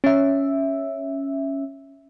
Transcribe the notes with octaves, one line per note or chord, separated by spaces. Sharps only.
C#4 E5